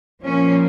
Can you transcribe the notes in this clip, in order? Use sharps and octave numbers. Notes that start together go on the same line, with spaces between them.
A#2 F3 A#3 C#4